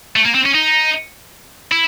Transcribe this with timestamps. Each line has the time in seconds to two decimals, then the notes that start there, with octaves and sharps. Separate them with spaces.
0.16 A3
0.25 A#3
0.35 C4
0.46 C#4
0.55 D#4
1.72 E4